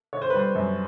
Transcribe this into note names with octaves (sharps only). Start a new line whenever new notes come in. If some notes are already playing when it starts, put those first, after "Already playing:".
D3 C#5
C5
B4
G3 C5
F#2